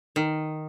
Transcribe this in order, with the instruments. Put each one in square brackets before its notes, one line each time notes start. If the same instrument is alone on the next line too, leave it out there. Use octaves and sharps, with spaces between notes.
[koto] D#3